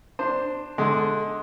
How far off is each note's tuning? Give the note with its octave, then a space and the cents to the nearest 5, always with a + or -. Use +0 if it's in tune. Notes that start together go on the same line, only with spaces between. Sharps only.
D4 +10 C5 +0
D3 +0 G#3 +15